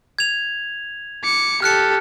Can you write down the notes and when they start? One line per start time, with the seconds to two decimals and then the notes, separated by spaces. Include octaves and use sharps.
0.19 G#6 F7
1.24 D6 C#7
1.62 G4 A4 F6 F#6 C#7